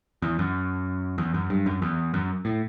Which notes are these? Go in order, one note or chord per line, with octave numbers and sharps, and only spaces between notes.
E2
F#2
E2
F#2
G2
F#2
E2
F#2
A2